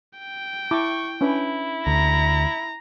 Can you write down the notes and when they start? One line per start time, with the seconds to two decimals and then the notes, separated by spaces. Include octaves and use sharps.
0.19 G5
0.71 E4 A5 C#6 D6
1.21 C#4 D4 E4 B4
1.87 D2 A#5